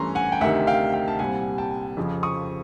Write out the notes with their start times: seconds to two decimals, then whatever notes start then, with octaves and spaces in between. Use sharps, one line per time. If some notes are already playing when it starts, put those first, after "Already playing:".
Already playing: G2 E3 A3 C#4 A#5 C6
0.15 F#5 G#5
0.32 G5
0.41 D2 C3 D#3 E5 F#5
0.67 F5 G5
0.93 F5 G5
1.08 A5
1.19 C2 A#2 G3 C4 F#5 G#5
1.58 G5 A5
1.97 F2 C#3 F3
2.23 C#6 D#6